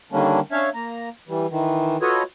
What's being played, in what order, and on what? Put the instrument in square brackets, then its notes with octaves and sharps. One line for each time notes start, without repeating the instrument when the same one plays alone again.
[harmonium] D3 D#3 G3 A#3 C#4 D4
C#4 D4 C#5 E5 F5
A#3 A#5
E3 G3
D#3 E3
F4 F#4 A4 B4 C#5 D#5